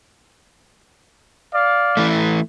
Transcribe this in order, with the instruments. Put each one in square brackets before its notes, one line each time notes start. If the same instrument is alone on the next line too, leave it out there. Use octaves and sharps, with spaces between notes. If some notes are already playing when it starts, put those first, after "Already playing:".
[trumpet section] D5 F5
[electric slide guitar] E3 A3